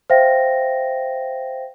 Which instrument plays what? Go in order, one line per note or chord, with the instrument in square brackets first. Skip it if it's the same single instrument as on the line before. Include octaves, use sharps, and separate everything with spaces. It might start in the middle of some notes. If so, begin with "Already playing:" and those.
[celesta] C5 E5 F5 G5 A#6